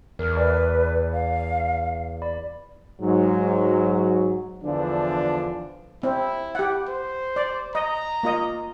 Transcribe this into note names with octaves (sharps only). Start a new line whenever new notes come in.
E2 A#4 F6
B4 D5
F5
D5 B5
G#2 F#3
E2 D3 E3 F3 D4
C4 E4
G4 F#5
C5
D5
D#5 A#5
A#3 F4 D#5